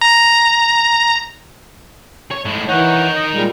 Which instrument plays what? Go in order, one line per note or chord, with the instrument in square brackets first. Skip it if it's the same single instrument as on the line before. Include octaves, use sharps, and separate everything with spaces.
[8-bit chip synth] A#5
[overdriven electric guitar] C#5
A2 G#3
[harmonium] E3 C#5 F#5 [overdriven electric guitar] D#4 A#4
[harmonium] D#5
A#2 G3 G#3